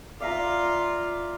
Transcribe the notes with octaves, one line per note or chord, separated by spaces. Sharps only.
F4 D5 E5 F5 A#5